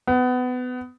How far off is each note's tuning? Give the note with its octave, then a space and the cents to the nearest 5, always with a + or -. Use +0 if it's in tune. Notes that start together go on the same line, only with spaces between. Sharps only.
B3 +25